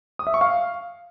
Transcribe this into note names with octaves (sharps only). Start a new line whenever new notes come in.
D#6
E5
C#6
F5